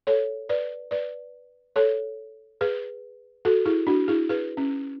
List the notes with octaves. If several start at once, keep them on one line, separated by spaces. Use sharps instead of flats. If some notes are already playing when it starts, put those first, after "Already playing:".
A4 C#5
B4 D5
B4 D5
A4 C#5
G#4 B4
F#4 A4
E4 G#4
D4 F#4
E4 G#4
G#4 B4
C#4